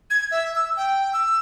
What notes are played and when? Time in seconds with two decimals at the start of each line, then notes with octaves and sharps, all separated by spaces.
0.10 G#6
0.31 E5
0.55 E6
0.76 G5
1.13 E6